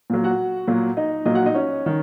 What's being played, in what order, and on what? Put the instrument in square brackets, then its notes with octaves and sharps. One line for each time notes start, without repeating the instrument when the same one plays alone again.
[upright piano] A#2 F#3
F#4 F#5
A#2 F#3
D#4 D#5
A#2 F#3 D#4 D#5
F#4 F#5
D#4 D#5
C#4 C#5
D#3